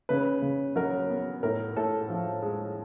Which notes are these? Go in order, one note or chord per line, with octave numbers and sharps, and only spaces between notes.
C#3 B4
C#3
F#3 A#4
B3
A2 A#4
A2 A4
F3
G#3